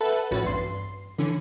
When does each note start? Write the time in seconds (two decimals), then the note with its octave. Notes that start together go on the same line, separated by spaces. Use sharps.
0.01 A4 B4 E5 F#5 A5
0.31 A#1 A2 C#4 F#4 B4 A6
0.44 E2 G2 C6
1.18 D3 E3 C#4